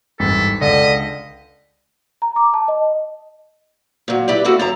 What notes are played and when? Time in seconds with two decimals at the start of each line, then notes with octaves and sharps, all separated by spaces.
0.20 G#1 E2 G2 A4 B6
0.61 C#2 D3 D#5
2.22 A#5
2.36 D6
2.54 A5
2.68 D#5
4.08 A#2 F#3
4.28 E4 G4 B4 D5
4.45 A3 A#3 F#4 A4
4.59 F#2 A5 A#5